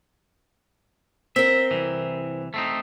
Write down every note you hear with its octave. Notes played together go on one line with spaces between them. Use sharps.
C4 A#4 E5
C2 E3
A3 C4 D#4